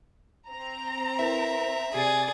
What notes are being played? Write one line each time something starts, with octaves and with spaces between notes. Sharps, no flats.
C4 A#5
E4 A#4 B4 E5
C3 G#4 D5 G#5 A6